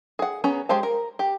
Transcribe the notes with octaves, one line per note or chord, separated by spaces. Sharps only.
G#4 F#5
B3 C#4 G#4 A#5
G#3 G4 C5 F5 A5
A#4
G4